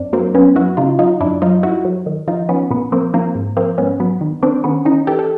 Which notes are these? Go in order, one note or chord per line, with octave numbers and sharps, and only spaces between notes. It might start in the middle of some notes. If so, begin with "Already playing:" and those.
Already playing: F#2 C4 D4
F#3 A#3 C4
F#2 B3 C#4
F#2 E4 F#4
C#3 D#4 F4
F#3 D#4 F4
F#2 D4 E4
F#3 D#4 F4
G2 E4 F#4
F#3
D#3
F3 D#4 F4
F3 B3 C#4
A#2 B3
F3 A#3 C4
F3 A#3 C4
G#2
F3 A#3 C4
G#2 B3 C#4
F#3 B3
D#3
D#3 C4 D4
D#3 B3 C#4
E3 C#4 D#4
E3 G4 A4
A4